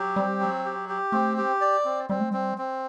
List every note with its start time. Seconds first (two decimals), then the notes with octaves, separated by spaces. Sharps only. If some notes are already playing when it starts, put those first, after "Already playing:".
Already playing: F#3 G4
0.16 G3 C4
0.40 F#3
0.65 G4
0.89 G4
1.12 A3 C4
1.37 G4
1.61 D5
1.85 C4
2.09 G3 C4
2.20 A3
2.31 G3 C4
2.58 C4